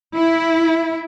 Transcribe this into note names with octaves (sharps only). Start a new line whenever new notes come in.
E4